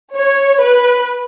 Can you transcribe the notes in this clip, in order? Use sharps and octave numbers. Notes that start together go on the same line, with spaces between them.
C#5
B4